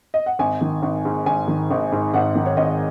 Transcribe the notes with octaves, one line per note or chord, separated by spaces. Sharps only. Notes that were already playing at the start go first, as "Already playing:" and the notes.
D#5
F#5
G#1 G#5
D#3
G#1
G#2
G#1 G#5
D#3
G#1
G#2
G#1 F#5
D#3
C#5
G#1 D#5